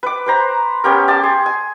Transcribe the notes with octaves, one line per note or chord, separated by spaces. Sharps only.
B4 D6
B4 C5 A#5
B3 C#4 G4 A#4
G4 A5 C6 D6
G#4
G#5